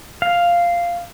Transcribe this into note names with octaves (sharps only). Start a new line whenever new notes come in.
F5